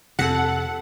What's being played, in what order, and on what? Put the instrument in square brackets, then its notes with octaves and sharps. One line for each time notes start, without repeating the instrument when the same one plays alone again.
[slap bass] F2 C3 [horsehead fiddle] A4 [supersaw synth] F#5